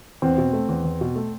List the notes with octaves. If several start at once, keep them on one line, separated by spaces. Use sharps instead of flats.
E2 C4
B2
A3
E2
E2
B2
A3